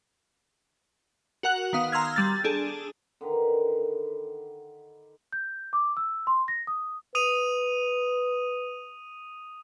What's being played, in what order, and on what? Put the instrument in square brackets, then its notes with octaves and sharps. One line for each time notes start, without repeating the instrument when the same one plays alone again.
[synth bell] F#4 A#4 F#5 F#6 F#7
D#3 B3 F5 D#6
A#5 C6 E6 F6 G#6
G3 A6
D4 G#4 A4
[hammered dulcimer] D3 D#3 B4 A#5
[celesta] G6
D6
E6
C6
A#6
D#6
[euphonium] B4 [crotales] D#6 D#7 F7